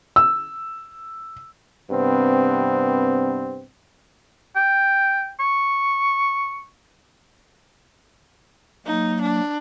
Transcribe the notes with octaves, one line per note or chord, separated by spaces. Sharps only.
E6
G2 C3 B3 C4
G5
C#6
F#3 A#3 D#4
D4